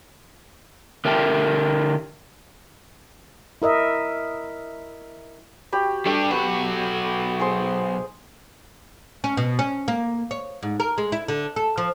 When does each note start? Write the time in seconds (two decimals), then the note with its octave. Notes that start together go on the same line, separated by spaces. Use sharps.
1.05 D3 G4 A#4 E5 G5 A5
3.62 E4 A#4 D#5 E5
5.72 F#4 G4 B5
6.06 G3 A3 D4 G4
6.31 B1 F#4 B4 B5
7.40 G#4 C5 C6
9.24 C#4
9.37 B2
9.59 C#4
9.88 A#3
10.31 C#5
10.63 G#2
10.80 A#4
10.98 G#3
11.12 E4
11.28 D3
11.56 A4
11.78 F3